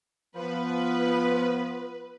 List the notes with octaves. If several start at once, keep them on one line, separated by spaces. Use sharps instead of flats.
F3 B3 B4